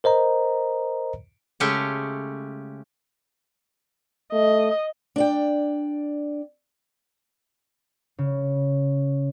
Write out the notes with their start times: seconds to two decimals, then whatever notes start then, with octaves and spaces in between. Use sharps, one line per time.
0.04 A#4 C5 D#5 A#5
1.60 C#3 G#3 A3 C#4 G4 C#5
4.33 A3 D#5
5.16 D4 D5 G5
8.18 C#3